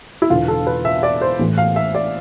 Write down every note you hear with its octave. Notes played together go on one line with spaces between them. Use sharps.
E4
E1 E2 D3 F4
A4
B4
E5
D5
C5
A1 A2 E3
F5
E5
D5